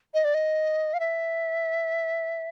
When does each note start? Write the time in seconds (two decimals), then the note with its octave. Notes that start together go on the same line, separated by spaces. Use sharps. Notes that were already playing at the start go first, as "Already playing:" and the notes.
0.14 D#5
0.24 D5
0.34 D#5
0.94 F5
1.00 E5